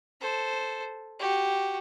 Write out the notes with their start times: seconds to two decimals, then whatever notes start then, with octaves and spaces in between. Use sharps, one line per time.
0.21 A4 C5
1.20 F#4 G4